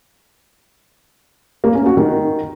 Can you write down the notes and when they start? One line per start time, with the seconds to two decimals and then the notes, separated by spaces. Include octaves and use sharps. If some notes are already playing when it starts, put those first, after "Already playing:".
1.64 A#3
1.75 C#4
1.86 F#4
1.97 D#3